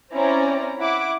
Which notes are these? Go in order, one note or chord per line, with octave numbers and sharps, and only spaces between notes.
C4 C#4 E4 C5 D5 A#5
E4 F#5 D6